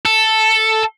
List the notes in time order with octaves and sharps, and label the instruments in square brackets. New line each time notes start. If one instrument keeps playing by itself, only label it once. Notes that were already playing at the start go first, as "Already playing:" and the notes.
[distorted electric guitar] A4